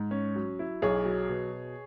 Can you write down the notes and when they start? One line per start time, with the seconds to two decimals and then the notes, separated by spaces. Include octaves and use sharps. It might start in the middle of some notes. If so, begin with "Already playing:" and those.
Already playing: G#2
0.11 C#4
0.36 F#3
0.59 E4
0.82 B1 G#4 C#5
1.05 F#3
1.29 B2